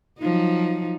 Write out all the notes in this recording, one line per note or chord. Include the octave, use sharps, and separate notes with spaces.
F3 F#3 D#4